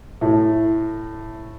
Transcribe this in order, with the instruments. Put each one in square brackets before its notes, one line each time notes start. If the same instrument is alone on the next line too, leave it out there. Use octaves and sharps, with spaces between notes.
[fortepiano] A2